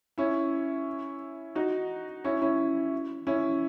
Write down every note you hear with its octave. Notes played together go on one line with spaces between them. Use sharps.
C#4 E4
D#4 F#4
C#4 E4
C#4 E4
C#4 E4